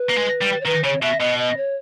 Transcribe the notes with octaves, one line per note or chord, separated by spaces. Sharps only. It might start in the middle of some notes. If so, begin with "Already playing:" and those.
Already playing: B4
A#3
G#3
G3
C#5
D#3 B4
C#3 C#5
B2 E5
B2 D#5
D#5
C#5